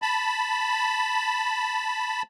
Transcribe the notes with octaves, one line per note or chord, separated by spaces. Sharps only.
A5 B5